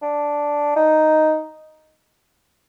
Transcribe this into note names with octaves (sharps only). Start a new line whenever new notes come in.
D4
D#4